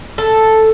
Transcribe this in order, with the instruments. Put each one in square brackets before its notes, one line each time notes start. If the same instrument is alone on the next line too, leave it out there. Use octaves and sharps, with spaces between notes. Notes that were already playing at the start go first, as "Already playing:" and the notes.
[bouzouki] A4